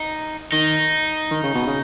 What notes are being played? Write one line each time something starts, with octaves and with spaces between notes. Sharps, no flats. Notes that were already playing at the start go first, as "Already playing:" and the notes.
Already playing: D#4
D#3 D#4
D#3
C#3
B2
C#3